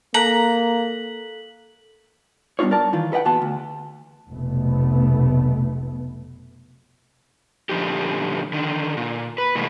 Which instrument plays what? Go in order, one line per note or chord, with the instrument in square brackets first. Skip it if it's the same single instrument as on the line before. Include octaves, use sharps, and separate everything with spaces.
[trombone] A#3 [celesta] A4 F#6 B6 [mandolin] A#5 [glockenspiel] F#7
[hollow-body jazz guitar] G3 B3 D4 D#4 F4 C#5
A#4 D5 A5
D#3 E3 F4
A4 B4 D#5 F#5 G5
E2 A#2 B3 F#4 A5 C6
D2
[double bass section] F1 B1 A3 B3
[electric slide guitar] A#2 D3 F3 D#4 G4
D3 D#3
A#2
B4
A2 C3 E3 F#3 G#3 A#3